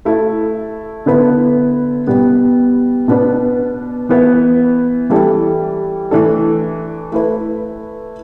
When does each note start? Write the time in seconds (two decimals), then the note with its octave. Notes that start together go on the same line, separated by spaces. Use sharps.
0.05 A3 E4 A4
1.06 D3 B3 E4 B4
2.07 B2 G3 B3
3.08 B2 B3 D4 B4
4.09 E3 B3 E4 B4
5.10 E3 G3 E4 A4
6.11 E3 A3 D4 A4
7.12 A3 E4 B4